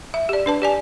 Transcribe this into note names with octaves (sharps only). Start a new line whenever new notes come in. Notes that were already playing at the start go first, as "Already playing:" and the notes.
E5
G4 D5
D4 B4 A5
G4 D5 G#5